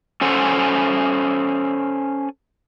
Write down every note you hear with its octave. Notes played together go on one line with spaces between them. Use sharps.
C#4 A4 C5 F#5 G#5